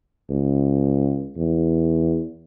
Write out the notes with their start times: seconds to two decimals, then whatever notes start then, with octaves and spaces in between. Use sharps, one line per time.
0.30 C#2
1.37 E2